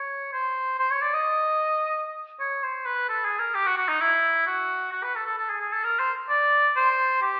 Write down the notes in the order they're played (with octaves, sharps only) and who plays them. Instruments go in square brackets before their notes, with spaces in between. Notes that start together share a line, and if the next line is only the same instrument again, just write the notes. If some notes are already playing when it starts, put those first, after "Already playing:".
Already playing: [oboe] C#5
C5
C5
C#5
D5
D#5
C#5
C5
B4
A4
G#4
A#4
G4
F#4
F#4
D#4
E4
F#4
F#4
B4
A4
A4
A4
G#4
G#4
A4
A#4
C5
D5
C5
G4